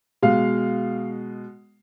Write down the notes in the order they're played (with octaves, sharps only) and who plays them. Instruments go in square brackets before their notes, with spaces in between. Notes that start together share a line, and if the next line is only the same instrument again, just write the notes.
[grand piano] B2 G#3 F5